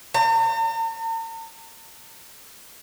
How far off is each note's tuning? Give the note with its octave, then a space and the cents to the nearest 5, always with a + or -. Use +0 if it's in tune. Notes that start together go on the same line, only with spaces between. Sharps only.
A#5 -45